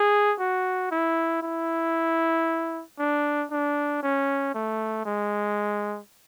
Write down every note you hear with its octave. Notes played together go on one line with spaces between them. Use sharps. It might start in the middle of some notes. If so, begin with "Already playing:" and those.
Already playing: G#4
F#4
E4
E4
D4
D4
C#4
A3
G#3